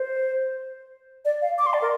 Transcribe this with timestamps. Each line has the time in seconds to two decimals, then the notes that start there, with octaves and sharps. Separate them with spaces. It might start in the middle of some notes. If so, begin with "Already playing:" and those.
Already playing: C5
1.25 D5
1.42 F5
1.58 D6
1.66 C6
1.74 D5
1.82 A#4